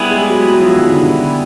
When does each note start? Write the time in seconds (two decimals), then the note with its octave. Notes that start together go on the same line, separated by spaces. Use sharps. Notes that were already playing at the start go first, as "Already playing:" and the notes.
Already playing: G3 B3 E4 G#4 B4
0.10 G#3
0.29 F#3
0.48 F#3
0.61 F3
0.76 D#3
0.89 D3
1.03 D3